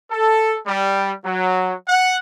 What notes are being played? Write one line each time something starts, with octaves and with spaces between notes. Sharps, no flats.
A4
G3
F#3
F#5